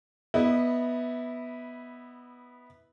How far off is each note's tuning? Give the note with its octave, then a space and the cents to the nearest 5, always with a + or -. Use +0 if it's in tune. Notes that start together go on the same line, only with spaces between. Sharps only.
B3 +0 E4 -15 D#5 -30